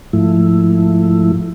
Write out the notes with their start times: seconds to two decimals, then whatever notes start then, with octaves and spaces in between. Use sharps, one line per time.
0.13 G#2 F3 A3 E4